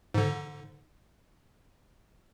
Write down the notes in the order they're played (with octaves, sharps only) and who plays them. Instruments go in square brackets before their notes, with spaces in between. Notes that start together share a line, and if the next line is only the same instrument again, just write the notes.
[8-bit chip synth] G#2 D3